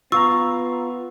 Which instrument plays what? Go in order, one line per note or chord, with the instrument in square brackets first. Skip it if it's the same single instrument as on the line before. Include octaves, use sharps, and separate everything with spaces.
[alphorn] B3 [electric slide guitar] F4 F5 A#5 [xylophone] C#6 [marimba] E6